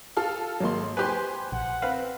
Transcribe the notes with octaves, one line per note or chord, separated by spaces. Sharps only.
F4 A4 F5
G#1 F#3 G#3 A#3 C6
G4 B4 C5 G#5 C6
A#1 F#5
C4 B4 F5